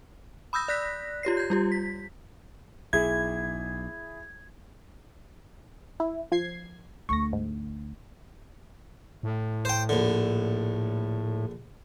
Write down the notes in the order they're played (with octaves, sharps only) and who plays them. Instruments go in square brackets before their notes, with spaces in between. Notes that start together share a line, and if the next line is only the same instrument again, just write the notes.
[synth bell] B5 D#6 E6 G6 A#6
D5 F#6 A#6 B6
F4 G4 C#5 C7
G6 G#6
G3 F4 G4
B6
[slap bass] B1 [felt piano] E4 G#4 [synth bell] G#6
[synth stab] E4
F3 G#6 C7
[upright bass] D2 A3 [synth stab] C#6 A#6
[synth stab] G#2
[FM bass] A2
[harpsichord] C5 G5
A#1 D3